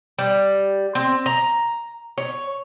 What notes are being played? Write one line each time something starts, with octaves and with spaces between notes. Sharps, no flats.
G3
C4
A#5
C#5